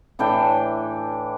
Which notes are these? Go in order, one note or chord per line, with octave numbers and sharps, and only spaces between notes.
A2 E3 D4 G5